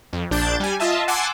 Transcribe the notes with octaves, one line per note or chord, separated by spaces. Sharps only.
F2
A#1 D4 G6 A6
G3 G#5
F4 D#5 E5 A5
F#5 G#5 A5 C6 D6 E6